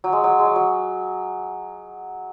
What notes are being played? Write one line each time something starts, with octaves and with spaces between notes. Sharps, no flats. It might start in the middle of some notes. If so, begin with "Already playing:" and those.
F#3
G#3
F#3
G#3
F#3
F#3